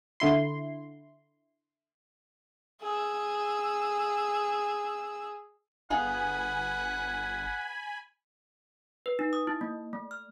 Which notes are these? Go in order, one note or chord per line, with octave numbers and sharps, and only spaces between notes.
D3 E4 C6
G#4 E6
G1 B3 G#4 F5 F#5 G#5 B5
B4
D#4
D#6
E4
A#3
A3
F6